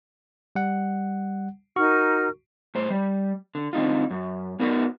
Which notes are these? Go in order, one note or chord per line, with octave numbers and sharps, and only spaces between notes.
G3 F#5
D#4 F#4 A#4 C#6 F6
A2 C5
G3
D3
D3 C4 D#4 F4
F#2
B3 D#4 F#4 A#4 B4